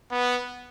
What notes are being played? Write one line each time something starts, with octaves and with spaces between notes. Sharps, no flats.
B3